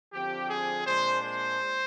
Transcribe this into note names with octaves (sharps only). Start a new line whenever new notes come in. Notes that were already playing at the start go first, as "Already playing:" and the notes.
D3 F3 C4 G4
G#4
A#2 G#3 D4 C5
C5